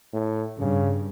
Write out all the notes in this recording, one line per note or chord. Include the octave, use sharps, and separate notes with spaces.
A2
G2 C#3